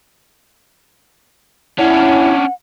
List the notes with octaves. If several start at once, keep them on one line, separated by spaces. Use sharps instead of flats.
C#4 D4 E4 F#5